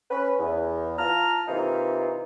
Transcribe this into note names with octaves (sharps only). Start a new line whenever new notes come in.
C#4 B4
E2
F4 A5 A#5 F6
C3 E3 A#3 D#4 F4